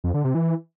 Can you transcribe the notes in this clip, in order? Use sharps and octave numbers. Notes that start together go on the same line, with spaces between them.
F2
D3
C3
E3